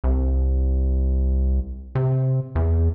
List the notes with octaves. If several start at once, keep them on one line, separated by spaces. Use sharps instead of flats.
C2
C3
E2